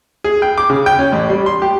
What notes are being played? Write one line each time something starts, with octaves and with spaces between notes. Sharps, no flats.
G#4
G5
D6
C#3
G5
C#4
A1
G3
C6
G4